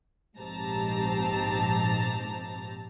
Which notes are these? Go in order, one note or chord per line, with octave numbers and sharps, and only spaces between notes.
A#1 G#2 C4 G4 A5 A#5